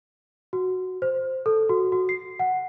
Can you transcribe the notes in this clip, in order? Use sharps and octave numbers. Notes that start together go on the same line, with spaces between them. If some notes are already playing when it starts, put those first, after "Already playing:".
F#4
C5
A4
F#4
F#4
C7
F#5